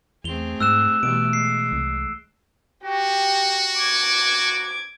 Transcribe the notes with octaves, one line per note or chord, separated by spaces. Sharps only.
E2 A3 C4 G#4 F7 G7
G#2 E6 F#6 E7
B2 E3 G3 A3 D7
G#3 C7
C2
F#4 G4
D6 G#6